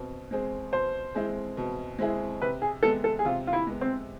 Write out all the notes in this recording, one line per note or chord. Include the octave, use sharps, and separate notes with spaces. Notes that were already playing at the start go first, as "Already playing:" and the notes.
Already playing: B2 C4
G#3 C4 G#4 C5
B2 C5
G#3 C4 E4 G#4
B2
G#3 C4 E4 G#4
C3 B4
G#4
G#3 B3 A4
A4
G#4
C3 F4
F4
E4
G#3 B3
C4